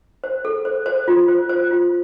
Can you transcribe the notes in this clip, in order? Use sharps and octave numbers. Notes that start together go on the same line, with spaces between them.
C5
A4
C5
C5
F4
C5
C5
F4